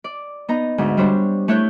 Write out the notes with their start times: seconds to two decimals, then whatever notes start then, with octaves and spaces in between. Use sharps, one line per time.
0.04 D5
0.48 B3 D#4 A#5
0.78 D2 G#2 D#5
0.97 G3 D4 C5 C#5
1.48 A3 E4 C#5 F#6 G6